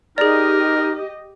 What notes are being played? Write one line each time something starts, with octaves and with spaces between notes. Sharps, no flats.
D#4 G4 G#4 A#4 D5 D#5